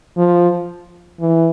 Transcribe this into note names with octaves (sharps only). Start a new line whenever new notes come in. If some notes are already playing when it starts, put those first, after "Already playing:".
F3
E3